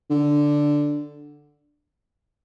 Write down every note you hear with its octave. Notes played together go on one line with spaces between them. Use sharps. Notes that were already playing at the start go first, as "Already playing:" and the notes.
D3